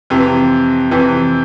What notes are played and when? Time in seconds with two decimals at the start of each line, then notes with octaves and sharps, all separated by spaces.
0.10 F2 C3 E3
0.91 F2 C3 E3